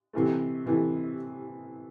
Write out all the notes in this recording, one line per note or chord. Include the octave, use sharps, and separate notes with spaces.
C3 E3 A3
C3 E3 A3